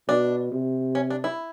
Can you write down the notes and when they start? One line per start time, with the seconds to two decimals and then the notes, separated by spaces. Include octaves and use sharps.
0.08 B2 D4
0.52 C3
0.95 C#4
1.10 D4
1.24 E4